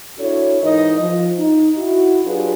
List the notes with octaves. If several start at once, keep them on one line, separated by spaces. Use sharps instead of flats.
D4 E4 F#4 A4 C#5
G#2 E3 D#4 A#4 D#5
F3
D#4
E4 F#4
F#3 D4 F4 G4 G#4 B4